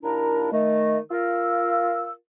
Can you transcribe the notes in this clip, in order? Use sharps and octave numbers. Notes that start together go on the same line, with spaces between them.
D#2 A#2 D4 E4 A#4 A#5
D#3 A3 D#5
F4 A#4 E6